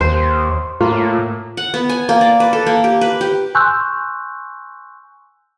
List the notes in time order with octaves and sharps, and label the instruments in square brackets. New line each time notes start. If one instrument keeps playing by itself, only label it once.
[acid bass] D#2 [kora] C5
[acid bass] A2 [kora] A#3 [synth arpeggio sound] F4
[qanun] F#5
B3
G#5
A#3
D5
B4
A4
A#3
G4
B4
G4
[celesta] G#5 C6 C#6 E6 F#6 G6